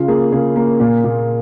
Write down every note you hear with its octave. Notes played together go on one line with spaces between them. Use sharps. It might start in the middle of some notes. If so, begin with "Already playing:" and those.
Already playing: C#3 F4
A#3 G#4
C#3 G#4
A#3
A#2
A#2